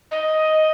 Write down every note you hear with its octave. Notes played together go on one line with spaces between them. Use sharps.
D#5